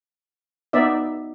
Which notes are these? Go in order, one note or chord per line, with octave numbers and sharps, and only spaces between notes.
B3 D#4 D5 E5